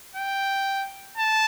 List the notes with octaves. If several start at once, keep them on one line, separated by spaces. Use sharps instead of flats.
G5
A5